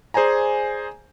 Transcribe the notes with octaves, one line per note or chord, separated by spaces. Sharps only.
G#4 C5 D5 G#5 A#5